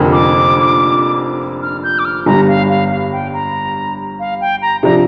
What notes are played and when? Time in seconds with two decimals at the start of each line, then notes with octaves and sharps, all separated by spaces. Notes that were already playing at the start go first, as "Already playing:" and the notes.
Already playing: F1 F2 D3 A#3 G4
0.12 D6
1.62 F6
1.83 G6
1.99 D6
2.05 F6
2.26 G1 G2 G3 A#5
2.48 F5
2.69 F5
2.90 F5
3.12 G5
3.33 A#5
4.20 F5
4.41 G5
4.62 A#5
4.83 C3 F3 D4 A#5